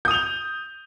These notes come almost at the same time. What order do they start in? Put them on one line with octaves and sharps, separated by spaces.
G6 D#6 F7 G7